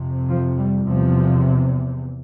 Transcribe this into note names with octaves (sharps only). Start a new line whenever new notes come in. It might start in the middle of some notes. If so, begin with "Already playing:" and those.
Already playing: F2 C3
F3
G3
E2 C3 F3